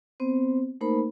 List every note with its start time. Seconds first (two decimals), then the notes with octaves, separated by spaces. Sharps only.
0.20 B3 C4 C5
0.81 A3 A#3 D#4 A#4 C5 B5